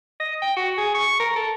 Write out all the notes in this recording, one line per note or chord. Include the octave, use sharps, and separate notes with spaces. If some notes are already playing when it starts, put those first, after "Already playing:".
D#5
G5
F#4
G#4
C#6
A#4
A4